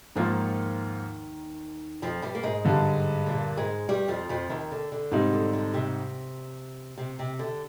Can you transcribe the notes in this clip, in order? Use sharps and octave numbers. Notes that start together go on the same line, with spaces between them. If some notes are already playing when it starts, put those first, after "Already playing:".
D#2 G#2 D#3 F3 A#3 F4
F2 F3
G2 G3
A#3
G#2 G#3
G2 D3 G3
A#2 A#3
G#2 G#3
G2 G3
F2 F3
F2 F3
D#2 D#3
D3
D3
G#2 C3 G3 C4 D#4
D3
D3
C3
C3
C3
D3